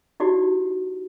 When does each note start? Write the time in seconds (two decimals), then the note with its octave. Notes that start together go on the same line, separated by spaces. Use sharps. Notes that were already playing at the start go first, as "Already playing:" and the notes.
0.20 D#4 E4 F#4 G4 D5